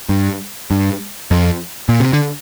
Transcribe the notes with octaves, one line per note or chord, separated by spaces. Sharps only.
G2
G2
F2
A#2
C3
D3